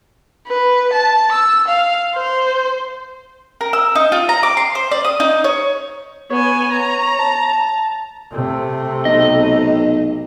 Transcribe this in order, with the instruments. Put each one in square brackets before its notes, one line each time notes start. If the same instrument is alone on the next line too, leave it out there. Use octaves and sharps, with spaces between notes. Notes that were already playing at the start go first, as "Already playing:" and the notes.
[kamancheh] B4
A5
E6
F5
C5
[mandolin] A#4
E6
D#4
F4
A#5
D6
C6
C5
D5
D#6
D#4
C#5
[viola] B3 G#5 [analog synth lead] C#5
[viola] A#5
[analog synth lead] A5
[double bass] C3 A3
[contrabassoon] B1 [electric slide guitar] D#5